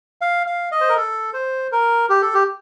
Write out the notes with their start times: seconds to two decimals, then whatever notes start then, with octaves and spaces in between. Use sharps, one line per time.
0.21 F5
0.47 F5
0.72 D#5
0.81 C5
0.89 A#4
0.96 A4
1.34 C5
1.72 A#4
2.09 G4
2.22 A4
2.34 G4